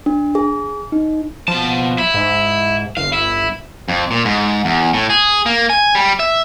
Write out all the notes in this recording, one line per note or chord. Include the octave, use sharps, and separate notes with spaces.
D4
G#4
D#4
B2 F3 A5
E4
G#2
G1 F5
E4
F2
A#2
G#2
E2
A2
G#4
A#3
G#5
G3
E5